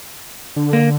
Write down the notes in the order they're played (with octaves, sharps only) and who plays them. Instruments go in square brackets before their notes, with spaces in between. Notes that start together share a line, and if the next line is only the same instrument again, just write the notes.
[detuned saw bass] D3
[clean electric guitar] A#3